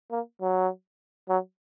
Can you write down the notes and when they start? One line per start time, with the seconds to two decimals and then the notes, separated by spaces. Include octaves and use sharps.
0.11 A#3
0.41 F#3
1.29 F#3